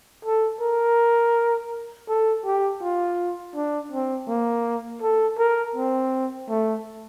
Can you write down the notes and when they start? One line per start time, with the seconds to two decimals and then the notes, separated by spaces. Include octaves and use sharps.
0.25 A4
0.61 A#4
2.08 A4
2.45 G4
2.82 F4
3.55 D4
3.92 C4
4.28 A#3
5.02 A4
5.38 A#4
5.76 C4
6.49 A3